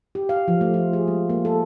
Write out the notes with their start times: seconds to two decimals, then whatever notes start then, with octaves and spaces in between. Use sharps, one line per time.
0.15 G4
0.29 F5
0.48 F3
0.61 A3
0.74 F4
0.93 G#4
1.08 G#3
1.30 A#3
1.45 A4